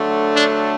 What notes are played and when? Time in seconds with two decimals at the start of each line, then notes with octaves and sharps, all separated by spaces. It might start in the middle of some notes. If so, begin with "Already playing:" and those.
Already playing: D3 F#3 A3
0.36 D4